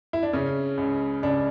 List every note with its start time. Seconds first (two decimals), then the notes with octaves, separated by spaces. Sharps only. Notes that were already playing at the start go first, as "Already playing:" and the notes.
0.13 E4
0.23 D4
0.33 C#3 C#4
0.78 C#2
1.23 C#2 D4